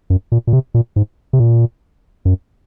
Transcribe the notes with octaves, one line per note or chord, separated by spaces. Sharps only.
F#2
A#2
A#2
C3
A#2
G#2
C3
A#2
F#2